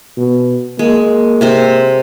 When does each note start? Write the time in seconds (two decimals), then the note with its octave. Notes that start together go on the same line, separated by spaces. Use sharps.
0.17 B2
0.79 G#3 A#3
1.41 C3 C4 C5